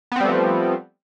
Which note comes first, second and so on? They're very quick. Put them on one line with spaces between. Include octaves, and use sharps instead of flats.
B3 C4 G3 A3 F3